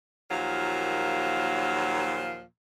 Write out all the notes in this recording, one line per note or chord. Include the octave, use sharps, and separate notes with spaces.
D#2 A#2 F3 F#3